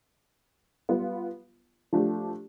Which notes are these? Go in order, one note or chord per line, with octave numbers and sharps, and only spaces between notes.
G3 B3 F4
F3 A3 D4 G4